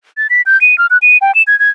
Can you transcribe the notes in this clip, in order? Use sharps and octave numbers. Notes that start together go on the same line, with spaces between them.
A6
B6
G6
D#7
F6
F#6
D#7
G5
E7
G#6
G#6